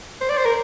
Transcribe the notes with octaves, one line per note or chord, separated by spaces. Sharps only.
C5
D5
C5
A#4